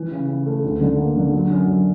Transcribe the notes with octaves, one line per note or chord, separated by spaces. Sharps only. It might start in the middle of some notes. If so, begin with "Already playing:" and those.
Already playing: E3
C#3
C#3
A3
D2
D3
A#3
D3
F#3
F#2
F#2